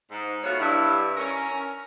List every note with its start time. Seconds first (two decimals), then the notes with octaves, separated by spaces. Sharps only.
0.11 G#2
0.43 B2 F#3 A3 F4 F#4 C#5
0.60 G2 E4
1.17 C#4 A#4